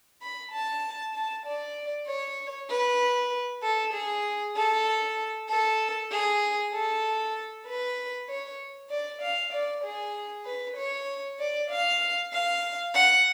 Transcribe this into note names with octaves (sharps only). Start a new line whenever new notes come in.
B5
A5
A5
D5
C#5
B4
A4
G#4
A4
A4
G#4
A4
B4
C#5
D5
F5
D5
G#4
B4
C#5
D5
F5
F5
F#5